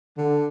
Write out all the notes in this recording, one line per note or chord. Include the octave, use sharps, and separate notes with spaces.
D3